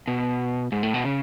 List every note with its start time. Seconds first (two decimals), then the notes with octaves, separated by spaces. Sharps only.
0.08 B2
0.72 G#2
0.83 A2
0.94 B2
1.04 C#3